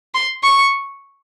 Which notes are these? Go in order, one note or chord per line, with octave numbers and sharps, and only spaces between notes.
C6
C#6